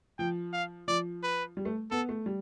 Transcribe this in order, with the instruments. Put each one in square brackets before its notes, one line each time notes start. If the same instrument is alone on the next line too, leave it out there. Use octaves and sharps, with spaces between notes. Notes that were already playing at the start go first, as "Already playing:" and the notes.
[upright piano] F3 [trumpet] G5
[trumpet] F5
[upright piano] F3 [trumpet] D5
[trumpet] B4
[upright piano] G3
A3
[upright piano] B3 [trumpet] A4
[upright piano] A3
G3